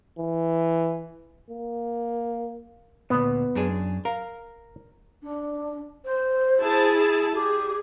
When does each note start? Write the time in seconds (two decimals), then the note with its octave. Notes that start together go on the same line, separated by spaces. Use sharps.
0.19 E3
1.51 A#3
3.10 D2 A#2 B3
3.55 F#2 D4 G#4
4.05 A#4 F5
5.22 D4
6.04 C5
6.61 E4 G#4 A5
7.33 G4 G#4